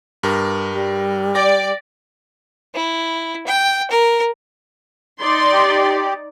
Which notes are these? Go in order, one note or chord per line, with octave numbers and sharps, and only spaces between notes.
G2 G4 A#4
G3
D5 G5 D6 A#6
E4
G5
A#4
D#4 D5 C6
G4